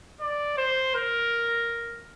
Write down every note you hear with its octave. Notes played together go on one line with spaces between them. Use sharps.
D5
C5
A#4